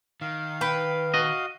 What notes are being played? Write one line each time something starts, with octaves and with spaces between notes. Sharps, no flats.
D#3 F5
B4 G5
F#4 D#5